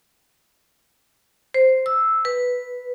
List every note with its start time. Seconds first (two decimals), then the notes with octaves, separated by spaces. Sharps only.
1.54 C5
1.86 E6
2.25 B4